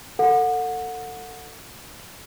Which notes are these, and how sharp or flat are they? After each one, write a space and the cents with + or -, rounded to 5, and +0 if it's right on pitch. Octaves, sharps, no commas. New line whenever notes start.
A4 +30 F#5 -25